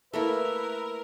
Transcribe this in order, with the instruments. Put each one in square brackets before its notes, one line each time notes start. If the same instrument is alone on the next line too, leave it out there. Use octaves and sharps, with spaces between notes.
[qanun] A3 A#3 E4 [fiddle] A#4 [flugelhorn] B4 [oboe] E5